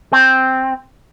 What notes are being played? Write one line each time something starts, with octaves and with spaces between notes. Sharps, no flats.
C4